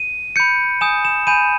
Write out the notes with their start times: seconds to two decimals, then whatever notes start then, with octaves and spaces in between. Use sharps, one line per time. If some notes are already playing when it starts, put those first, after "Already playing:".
Already playing: D#7
0.36 B5 G6 C#7
0.81 G#5 D#6 G6 E7
1.05 E7
1.27 G#5 B5 G6 D#7